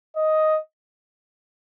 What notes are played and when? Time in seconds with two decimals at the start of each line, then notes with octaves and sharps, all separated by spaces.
0.16 D#5